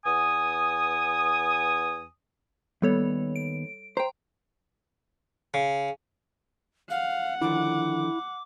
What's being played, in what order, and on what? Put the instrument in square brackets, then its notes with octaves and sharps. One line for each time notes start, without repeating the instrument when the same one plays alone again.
[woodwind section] E2 B3 G#5 D#6
[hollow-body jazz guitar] D#2 B3 [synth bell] G3 A4 C#5
[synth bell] D7
[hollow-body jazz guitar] C5 [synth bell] G5 A#5
[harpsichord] C#3
[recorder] F5 [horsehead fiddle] F#5
[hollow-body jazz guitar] D3 D#3 F3 [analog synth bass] E4 [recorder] D6